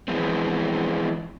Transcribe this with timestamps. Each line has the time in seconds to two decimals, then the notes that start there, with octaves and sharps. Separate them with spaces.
0.08 E3 F3 G#3 B3 C4